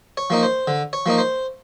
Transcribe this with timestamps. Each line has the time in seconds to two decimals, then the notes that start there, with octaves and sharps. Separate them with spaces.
0.17 C#5
0.30 F3 A#3 D#4
0.43 C5
0.67 D3
0.93 C#5
1.06 F3 A#3 D#4
1.18 C5